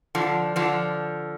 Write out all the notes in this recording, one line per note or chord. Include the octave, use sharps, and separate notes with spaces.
D3 F3
D3 F3